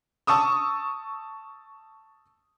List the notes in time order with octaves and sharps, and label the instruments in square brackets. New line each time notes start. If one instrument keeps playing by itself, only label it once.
[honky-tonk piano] A5 C#6 D#6 E6